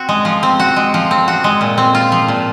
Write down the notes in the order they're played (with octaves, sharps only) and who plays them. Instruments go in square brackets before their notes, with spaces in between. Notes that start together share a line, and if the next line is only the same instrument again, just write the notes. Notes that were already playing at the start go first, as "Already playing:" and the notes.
Already playing: [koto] C4 F#4
G#3
F3
C4
F#4
G#3
F3
C4
F#4
G#3
A#2
C4
F4
F3
A#2